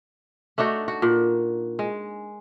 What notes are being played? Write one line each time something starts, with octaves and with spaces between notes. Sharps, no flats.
A3 D4 D#4 F#4
F#4
A#2
G#3